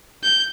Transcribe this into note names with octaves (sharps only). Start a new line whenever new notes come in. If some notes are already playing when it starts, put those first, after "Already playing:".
G6